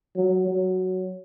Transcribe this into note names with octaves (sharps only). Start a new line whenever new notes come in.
F#3
F#3